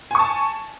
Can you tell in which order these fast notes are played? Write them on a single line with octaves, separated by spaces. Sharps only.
G#5 C#6 A5